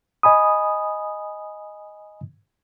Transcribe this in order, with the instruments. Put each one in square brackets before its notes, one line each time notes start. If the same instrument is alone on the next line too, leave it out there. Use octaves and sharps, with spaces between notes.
[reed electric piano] D#5 G#5 B5 D#6